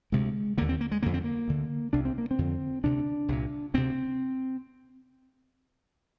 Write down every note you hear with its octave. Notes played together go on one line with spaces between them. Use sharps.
D2 C3 G#3
D#2 D3 A#3
C4
A#3
G#3
F2 D3 A#3
C4
A#3
D2 D3
C2 C3 D4
C4
A#3
C4
F2 D3
D2 C3 D4
C2 A#2
D2 C3 C4